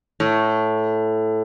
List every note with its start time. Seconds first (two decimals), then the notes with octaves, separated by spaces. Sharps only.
0.20 A2